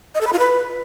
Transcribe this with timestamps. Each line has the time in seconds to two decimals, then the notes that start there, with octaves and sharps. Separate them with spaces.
0.15 D#5
0.21 A4
0.27 B5
0.33 F4
0.39 B4